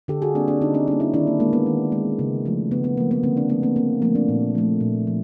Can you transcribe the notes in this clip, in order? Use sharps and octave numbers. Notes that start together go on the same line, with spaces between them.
D3 G4 A4
F#4 G#4
G3 A#3 C4 D4
C4 D4
D3 C#4 D#4
C4 D4
G3 A#3 C#4 D#4
D4 E4
D#3 D4 E4
A#3
G#3 A#3
B3
D#3
G#3
C#3
F3 A3
C#3 B3
B3
F3 A3 A#3
B3
D3 A#3 C4
C4 D4
F3 A3 B3
A#3 C4
D3 A#3 C4
F3 A3 A#3
C4 D4
A#2
F3 A3
A#2
F3